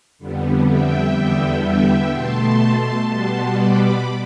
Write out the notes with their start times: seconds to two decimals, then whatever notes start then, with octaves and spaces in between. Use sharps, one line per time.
0.19 F2 D3 G3 B3
0.66 E5 G5
1.15 E2 D3 G3 B3
1.63 E5 G5
2.11 B2 A3 A5 C6
3.07 B2 G3 B3 A5 C6
3.56 B5 D6